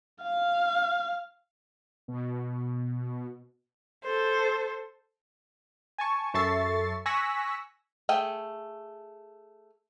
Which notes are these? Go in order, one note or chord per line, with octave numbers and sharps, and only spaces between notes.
F5
B2
A4 C5
G#5 A5 C#6
F#2 A4 E5 C#6 A6 C7
G#5 C#6 E6 F#6 A#6 B6
A3 G#4 G5